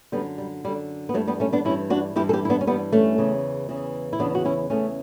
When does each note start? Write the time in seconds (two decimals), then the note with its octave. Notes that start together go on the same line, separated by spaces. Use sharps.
0.12 F#2 D3 G3 B3
0.38 G3
0.64 F#2 G3
0.68 D3
1.09 B3
1.14 G2 F#3 A3
1.19 E3
1.28 G3 B3
1.40 A3 C#4
1.53 B3 D4
1.65 G2 C#4 E4
1.70 E3
1.90 D4 F#4
2.16 G2 E4 G4
2.20 E3
2.29 A4
2.33 E4 G4
2.45 E4
2.50 B3 D4
2.61 C#4
2.67 G2 E3 G3 B3
2.92 A3 C#4
3.18 E2 C#3 E3
3.69 E2 C#3 E3
4.13 E4
4.19 E2 C#3 E3 B3 D4
4.35 F#4
4.45 C#4 E4
4.70 E2 C#3 E3 A3 C#4